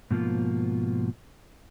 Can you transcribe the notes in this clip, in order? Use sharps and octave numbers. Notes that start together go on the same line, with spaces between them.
G#2 B2 F3 A#3 F4